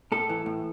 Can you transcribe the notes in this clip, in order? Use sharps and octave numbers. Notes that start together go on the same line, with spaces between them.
A2 A4
E3
A2